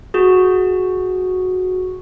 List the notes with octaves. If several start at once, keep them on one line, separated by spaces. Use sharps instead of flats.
F#4 G#4